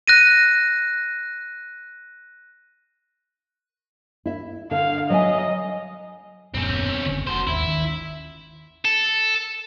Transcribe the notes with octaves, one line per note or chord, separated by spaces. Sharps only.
F#6 A#6 D#7
E4 E5
D3 F5
F#3 D#5 E5 G#5
D#1 F#2 A#2 C4 C#4
F#1 D3
F1 F#4 C5
G#1 D#2 E4
D#3 C#4
A4